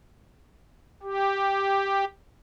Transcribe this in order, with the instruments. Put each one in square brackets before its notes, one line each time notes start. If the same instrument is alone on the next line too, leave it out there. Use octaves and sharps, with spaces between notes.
[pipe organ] G4